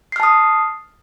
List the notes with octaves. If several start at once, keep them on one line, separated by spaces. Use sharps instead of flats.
A5 D#6 F6 C7